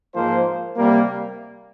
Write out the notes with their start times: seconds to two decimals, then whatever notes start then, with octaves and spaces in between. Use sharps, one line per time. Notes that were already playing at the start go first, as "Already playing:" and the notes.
0.14 G#2 F3 A#3 F4 C5
0.76 C3 G3 A#3